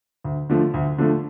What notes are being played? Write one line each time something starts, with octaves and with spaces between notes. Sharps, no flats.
D2
D3 F3 A3
D2
D3 F3 A3